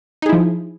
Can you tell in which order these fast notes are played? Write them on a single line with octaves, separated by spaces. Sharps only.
D#4 G#4 E4 F3